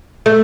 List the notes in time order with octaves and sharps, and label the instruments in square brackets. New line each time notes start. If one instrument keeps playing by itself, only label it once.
[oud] A3